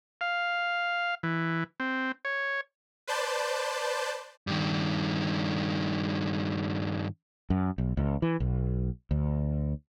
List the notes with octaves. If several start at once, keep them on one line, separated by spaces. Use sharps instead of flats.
F5
E3
C4
C#5
B4 C5 D5 A5 G6
G2 D#3
F#2
B1
C#2
E3
B1
D2